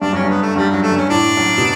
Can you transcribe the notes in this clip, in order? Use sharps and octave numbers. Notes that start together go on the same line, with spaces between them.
G2 D4
F#2 C#4
G2
B3
A3
G2 G3
F#2 F#3
A3
G2
C#4
A2 D4
F#2
B2